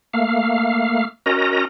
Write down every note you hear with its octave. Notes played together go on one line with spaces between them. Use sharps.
A3 A#3 F5
C#4 F#4 A#4 D#5 A#5